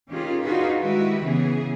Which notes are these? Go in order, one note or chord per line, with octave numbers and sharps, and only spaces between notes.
D#3 C#4 F4 G4 G#4
D4 D#4 F4 F#4 G#4 B4
D#3 G#3 E4 F#4 G4 B4
C#3 E3 B3 C#4 G#4